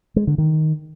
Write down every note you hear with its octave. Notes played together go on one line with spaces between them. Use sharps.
G#3
D3
D#3